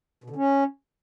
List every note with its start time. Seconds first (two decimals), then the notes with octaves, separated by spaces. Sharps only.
0.24 B2
0.30 D3
0.36 C#4